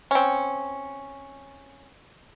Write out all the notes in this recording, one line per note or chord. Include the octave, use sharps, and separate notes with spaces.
C4 C#4